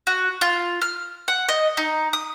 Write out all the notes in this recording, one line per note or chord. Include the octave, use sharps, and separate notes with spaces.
F#4
F4
F6
F#5
D#5
D#4
D#6